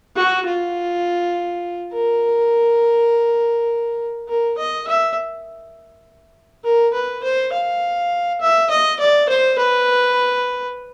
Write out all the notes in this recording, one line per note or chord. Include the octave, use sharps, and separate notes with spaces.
F#4
F4
A#4
A#4
D#5
E5
A#4
B4
C5
F5
E5
D#5
D5
C5
B4